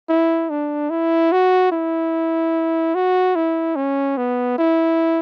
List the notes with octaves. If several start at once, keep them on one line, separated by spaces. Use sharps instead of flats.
E4
D4
E4
F#4
E4
F#4
E4
C#4
B3
E4